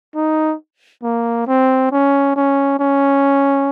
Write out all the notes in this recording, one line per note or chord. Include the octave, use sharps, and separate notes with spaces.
D#4
A#3
C4
C#4
C#4
C#4